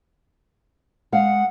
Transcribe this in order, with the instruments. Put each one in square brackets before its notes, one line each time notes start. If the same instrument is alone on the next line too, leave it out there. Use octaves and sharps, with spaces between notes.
[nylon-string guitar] G#3 F5 [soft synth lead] F#5